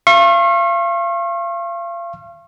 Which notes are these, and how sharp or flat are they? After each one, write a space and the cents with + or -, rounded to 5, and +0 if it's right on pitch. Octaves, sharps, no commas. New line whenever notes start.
F5 -35 C#6 -40